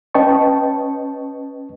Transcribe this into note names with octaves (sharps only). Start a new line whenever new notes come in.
C#4 B4 D#5 G5 A5 C#6